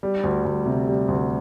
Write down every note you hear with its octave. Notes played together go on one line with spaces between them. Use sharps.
G3
D2
D2
C3
G3
D2